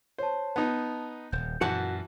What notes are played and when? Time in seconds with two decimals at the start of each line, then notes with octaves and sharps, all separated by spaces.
0.18 C5 C#5 A5
0.56 B3 D#4 A5
1.32 D#1 G6
1.61 F#2 A#2 E3 F#4 F#5 A5